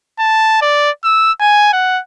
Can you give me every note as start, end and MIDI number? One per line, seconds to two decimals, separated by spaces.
0.19 0.58 81
0.62 0.91 74
1.04 1.32 88
1.40 1.73 80
1.73 2.01 78